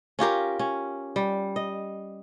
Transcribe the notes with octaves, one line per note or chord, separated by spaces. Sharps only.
C#4 F4 G4 A#4
C#4
G3
D#5